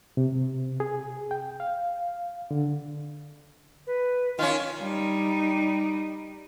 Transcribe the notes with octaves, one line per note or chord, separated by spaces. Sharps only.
C3
G#4
G5
F5
D3
B4
D#3 C#4 F4 F5
G3 D#4